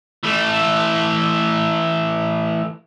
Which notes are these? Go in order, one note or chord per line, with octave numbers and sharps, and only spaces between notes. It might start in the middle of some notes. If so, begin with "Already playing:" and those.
E3 A3